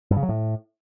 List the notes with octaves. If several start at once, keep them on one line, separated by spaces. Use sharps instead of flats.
G2
C#3
F#3
A2